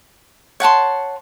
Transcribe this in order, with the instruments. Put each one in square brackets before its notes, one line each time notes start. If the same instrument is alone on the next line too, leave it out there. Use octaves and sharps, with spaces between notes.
[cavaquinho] C#5 F#5 A5 C6